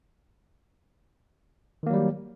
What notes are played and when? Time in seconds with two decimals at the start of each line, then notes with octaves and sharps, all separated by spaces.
1.83 D#3
1.86 A#3
1.90 F#3
1.93 G3